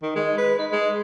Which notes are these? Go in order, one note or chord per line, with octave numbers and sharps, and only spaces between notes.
D#3
G#3
B4
D#4
G#3